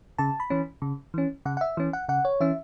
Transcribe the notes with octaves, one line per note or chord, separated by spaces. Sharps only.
C#3 A5
B5
E3 C#4
C#3
E3 C#4
C#3 F#5
F#5
E5
E3 C#4
F#5
C#3 F#5
C#5
E3 C#4 E5